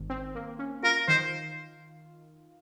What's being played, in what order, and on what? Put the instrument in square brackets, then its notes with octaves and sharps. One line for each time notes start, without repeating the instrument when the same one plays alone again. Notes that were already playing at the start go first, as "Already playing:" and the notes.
Already playing: [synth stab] G#1 D#3
C4
A#3
C#4
[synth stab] F4 [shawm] A#4
[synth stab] D#3 [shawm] C5